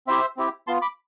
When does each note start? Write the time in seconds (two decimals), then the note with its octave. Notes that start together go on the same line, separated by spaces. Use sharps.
0.07 C4 E4 G4 C5 E5
0.37 C4 E4 G4
0.67 B3 F4 A5 C6
0.82 B5 D6